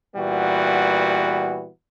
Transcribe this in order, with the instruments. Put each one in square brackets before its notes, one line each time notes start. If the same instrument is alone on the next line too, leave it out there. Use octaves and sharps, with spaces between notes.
[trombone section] A#2 E3 G3 B3 F#4